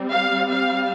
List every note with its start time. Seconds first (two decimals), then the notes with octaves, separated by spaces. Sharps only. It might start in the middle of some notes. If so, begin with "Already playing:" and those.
Already playing: G3 C4
0.11 F5
0.50 F5